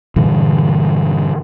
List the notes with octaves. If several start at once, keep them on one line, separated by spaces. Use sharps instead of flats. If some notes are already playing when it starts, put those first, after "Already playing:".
G2 A#2 D3 E3